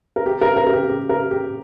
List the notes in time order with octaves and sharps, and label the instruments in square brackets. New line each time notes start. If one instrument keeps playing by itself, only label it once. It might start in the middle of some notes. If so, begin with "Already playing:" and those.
[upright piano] A#4
G4
A#4
A#4
A#4
G4
G4
A#4
G4